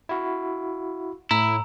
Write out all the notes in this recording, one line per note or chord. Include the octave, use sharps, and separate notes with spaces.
E4 F#4
A2 E4 A#5